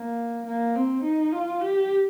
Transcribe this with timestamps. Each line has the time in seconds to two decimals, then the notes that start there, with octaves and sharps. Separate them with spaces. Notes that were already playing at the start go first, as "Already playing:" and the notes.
Already playing: A#3
0.46 A#3
0.76 C4
1.04 D#4
1.32 F4
1.61 G4